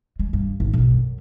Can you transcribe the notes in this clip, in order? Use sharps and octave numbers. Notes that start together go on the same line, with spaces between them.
G#3
G2
G#1
B1
F#2